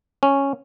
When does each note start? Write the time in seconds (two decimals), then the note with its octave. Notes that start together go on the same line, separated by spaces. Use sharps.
0.23 C#4